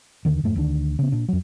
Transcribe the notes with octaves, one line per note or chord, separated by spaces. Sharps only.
D#2 D3 D#3
F2 G#2 A3
D2 D#3 A3 D4
C#3 B3
A#2 D4
F2 F#3